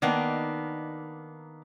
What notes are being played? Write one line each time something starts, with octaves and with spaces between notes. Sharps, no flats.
D#3 A#3 B3 D4 D#4